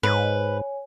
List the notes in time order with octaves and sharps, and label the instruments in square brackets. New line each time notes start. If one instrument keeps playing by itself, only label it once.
[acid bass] G#2 [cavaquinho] B4 [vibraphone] C#5 G#5